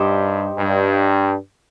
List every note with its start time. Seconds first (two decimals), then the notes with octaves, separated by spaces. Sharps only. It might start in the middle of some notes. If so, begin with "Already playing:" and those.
Already playing: G2 D#4 G4 C5
0.58 G2